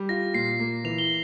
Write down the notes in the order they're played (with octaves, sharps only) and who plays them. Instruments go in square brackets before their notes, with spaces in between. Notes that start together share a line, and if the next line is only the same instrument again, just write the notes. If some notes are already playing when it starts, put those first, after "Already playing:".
Already playing: [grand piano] G3
[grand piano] F4 [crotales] A#6
[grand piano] A#2 [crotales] C7
[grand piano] A#3
[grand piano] E3 [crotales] F7
[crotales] G7